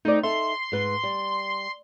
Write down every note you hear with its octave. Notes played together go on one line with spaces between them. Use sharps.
A3 C4 D#4 D5
D#4 A4 E5 C6
G#2 B4
G3